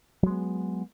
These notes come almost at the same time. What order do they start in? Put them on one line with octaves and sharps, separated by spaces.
F#3 G#3 B3